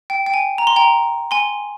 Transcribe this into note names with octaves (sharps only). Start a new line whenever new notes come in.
G5
G5
G#5
A#5
C6
G5 A#5
G#5 C6